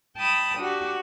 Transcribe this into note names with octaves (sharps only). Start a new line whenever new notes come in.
G5 A5 B5 D#6
D4 F#4 G4